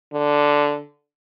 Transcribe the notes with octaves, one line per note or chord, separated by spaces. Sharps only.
D3